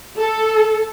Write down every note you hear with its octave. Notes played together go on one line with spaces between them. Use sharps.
A4